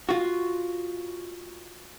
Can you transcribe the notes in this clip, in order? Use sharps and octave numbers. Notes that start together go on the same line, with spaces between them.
F4 F#4